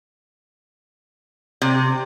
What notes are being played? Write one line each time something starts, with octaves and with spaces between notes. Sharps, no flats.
C3